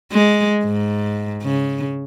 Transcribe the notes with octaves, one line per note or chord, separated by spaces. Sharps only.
G#3
G#2
C#3